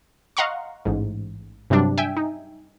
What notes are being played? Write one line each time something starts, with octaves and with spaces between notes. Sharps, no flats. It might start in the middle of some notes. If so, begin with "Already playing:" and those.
D#5 F5 F#5 A#5 C6 C#6
A1 G#2
G2 C3 F#3 G3 D4
E5 G5 G#5
D#4